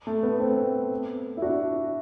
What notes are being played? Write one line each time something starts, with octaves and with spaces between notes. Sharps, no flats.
A3
B3
A3 C4
E4
D4 F#4